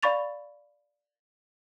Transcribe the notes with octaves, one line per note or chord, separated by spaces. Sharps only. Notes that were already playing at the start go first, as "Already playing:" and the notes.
D5 F5 B5 C#6 A6 F7